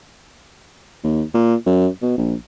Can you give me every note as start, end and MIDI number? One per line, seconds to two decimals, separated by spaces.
1.04 1.23 39
1.34 1.55 46
1.66 1.88 42
2.02 2.17 47
2.18 2.34 34